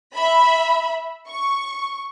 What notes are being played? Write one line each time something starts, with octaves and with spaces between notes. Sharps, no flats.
E5 B5
C#6